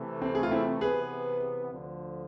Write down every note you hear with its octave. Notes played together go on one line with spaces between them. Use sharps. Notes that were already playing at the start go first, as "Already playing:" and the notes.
Already playing: C3 E3 A3
C4
G#4
F4
C4 E4
C3 E3 B3 G#4 B4
D2 D3 F3